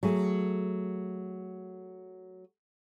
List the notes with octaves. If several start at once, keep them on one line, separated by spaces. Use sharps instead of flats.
F#3 A3 G#4